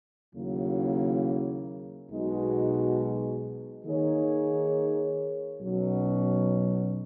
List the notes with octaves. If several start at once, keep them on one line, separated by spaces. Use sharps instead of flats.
D#2 C#3 F#3 A#3 E4
B1 B2 G#3 D#4 F#4
D#3 A#3 D#4 G#4 C#5
B1 B2 F#3 C#4